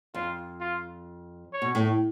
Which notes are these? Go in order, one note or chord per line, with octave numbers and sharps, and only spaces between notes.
F2 F4
F4
C#5
B2
A2